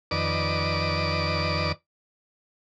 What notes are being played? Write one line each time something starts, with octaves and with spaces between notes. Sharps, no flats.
F2 D#3 B4 D5 D#5 D6